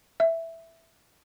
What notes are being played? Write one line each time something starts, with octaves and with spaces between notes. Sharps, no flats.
E5